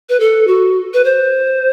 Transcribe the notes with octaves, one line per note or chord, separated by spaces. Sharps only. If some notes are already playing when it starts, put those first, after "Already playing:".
B4
A4
F#4
B4
C5